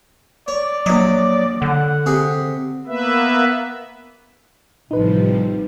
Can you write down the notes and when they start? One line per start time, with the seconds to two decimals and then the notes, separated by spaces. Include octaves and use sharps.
0.48 C#5 D5
0.86 A#1 F#3 D#5
1.62 D3 F#5
2.06 C3 G#4
2.87 A#3 B3 B4 E5
4.91 A1 A2 C3 F3 G3 D#4 B4